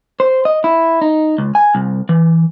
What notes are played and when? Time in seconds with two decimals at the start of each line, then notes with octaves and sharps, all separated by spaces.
0.20 C5
0.45 D#5
0.64 E4
1.02 D#4
1.38 C#2
1.55 G#5
1.75 C2
2.09 E3